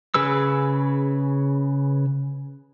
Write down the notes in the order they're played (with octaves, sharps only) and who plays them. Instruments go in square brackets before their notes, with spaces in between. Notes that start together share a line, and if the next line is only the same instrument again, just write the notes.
[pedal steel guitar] C#3 G#4 B4 E6